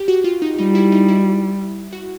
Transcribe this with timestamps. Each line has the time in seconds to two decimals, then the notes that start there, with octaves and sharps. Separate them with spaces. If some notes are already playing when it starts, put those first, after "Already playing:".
Already playing: G4
0.08 F#4
0.24 F4
0.42 D#4
0.58 G3 D#4
0.75 E4
0.92 D#4
1.09 E4
1.93 F#4